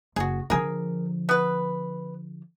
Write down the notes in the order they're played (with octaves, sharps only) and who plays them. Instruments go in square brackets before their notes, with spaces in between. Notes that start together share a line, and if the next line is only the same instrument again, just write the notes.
[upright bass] F#1 [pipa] F#4 G#4
[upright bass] D3 F3 [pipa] G#4 A#4
[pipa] B3 B4